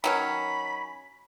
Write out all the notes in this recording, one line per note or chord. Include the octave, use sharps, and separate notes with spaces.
D#3 F#3 C#4 B5